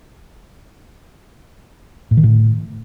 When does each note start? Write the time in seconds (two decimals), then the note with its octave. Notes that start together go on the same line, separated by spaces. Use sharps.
2.11 A2
2.17 D#3
2.23 A2